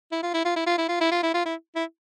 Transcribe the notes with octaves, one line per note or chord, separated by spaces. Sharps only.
E4
F4
E4
F4
E4
F4
E4
F4
E4
F4
E4
F4
E4
E4